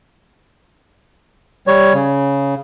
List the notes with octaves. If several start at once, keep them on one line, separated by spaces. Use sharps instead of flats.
G3 C#5
C#3